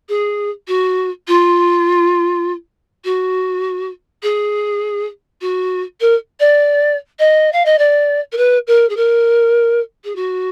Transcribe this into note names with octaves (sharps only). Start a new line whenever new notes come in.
G#4
F#4
F4
F#4
G#4
F#4
A#4
D5
D#5
F5
D#5
D5
A#4
B4
A#4
G#4
A#4
G#4
F#4